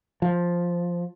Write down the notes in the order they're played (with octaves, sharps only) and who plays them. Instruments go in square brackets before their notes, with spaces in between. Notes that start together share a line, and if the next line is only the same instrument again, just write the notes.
[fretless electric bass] F3